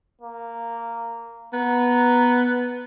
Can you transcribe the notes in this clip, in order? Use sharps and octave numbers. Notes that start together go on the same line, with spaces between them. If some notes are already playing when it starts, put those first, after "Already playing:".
A#3
B3 A#5